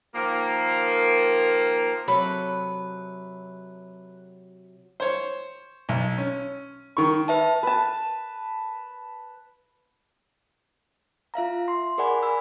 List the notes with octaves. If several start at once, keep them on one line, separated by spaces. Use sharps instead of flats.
D#3 F3 A#3
C3 F#3 A4 B4 B5
C5 C#5
B1
C#4
D#3 C#6
B4 E5 A5
B4 A5
F4 E5 F5 A#5
C6
G#4 A#4 D5 F#5 G#5 B5
G#5 B5 E6